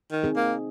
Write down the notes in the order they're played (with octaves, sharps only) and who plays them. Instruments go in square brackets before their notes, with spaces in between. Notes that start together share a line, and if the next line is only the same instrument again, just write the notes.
[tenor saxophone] D#3
[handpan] C4 D#4 G#4
[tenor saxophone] A#3